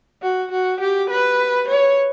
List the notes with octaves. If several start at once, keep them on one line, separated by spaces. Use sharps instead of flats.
F#4
F#4
G4
B4
C#5